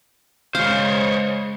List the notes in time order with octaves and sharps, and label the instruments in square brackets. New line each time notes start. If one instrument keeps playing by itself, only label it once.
[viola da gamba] C#3 G#3 [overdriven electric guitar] C5 C#5 [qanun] F5